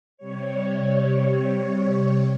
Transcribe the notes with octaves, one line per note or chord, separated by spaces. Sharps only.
C3 G3 C#5